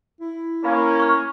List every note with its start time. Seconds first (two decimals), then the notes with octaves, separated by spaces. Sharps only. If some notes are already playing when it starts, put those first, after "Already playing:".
0.21 E4
0.64 A#3 C#4 A#4 F5 B5
1.00 C#6 F6